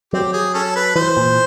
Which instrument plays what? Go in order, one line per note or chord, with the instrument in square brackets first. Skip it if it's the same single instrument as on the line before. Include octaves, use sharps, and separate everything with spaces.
[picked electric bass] F#3 [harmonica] C4 G4
[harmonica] G#4
C#4 A4
B4
[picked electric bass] E3 [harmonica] C5
[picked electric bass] A#2